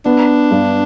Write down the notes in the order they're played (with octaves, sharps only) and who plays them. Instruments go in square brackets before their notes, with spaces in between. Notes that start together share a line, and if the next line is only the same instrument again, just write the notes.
[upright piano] B3 [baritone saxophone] D4
[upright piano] G2